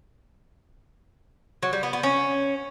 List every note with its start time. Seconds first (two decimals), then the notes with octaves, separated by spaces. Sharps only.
1.63 F#3
1.73 G3
1.83 B3
1.93 B3
2.03 C#4